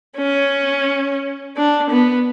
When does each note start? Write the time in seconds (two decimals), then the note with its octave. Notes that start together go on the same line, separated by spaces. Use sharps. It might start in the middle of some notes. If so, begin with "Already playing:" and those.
0.17 C#4
1.57 D4
1.90 B3